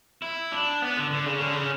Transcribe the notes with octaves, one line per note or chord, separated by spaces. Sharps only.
E4
D4
B3
D3
D3
C#3
D3
C#3